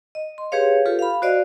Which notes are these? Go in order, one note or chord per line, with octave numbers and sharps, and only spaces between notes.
D#5
C6
G4 G#4 B4 C#5 F5
F4 G4 A4 B4
F5 B5
F#4 C5 D5 D#5 F5